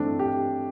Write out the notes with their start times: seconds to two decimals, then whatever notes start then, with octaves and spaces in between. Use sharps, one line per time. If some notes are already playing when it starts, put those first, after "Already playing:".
Already playing: G2 E3 A3 C4 D4
0.19 G4